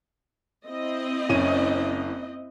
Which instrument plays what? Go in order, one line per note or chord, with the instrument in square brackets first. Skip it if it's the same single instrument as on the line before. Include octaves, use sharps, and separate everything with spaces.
[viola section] C4 E4 D#5
[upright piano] F#1 C#4 D#7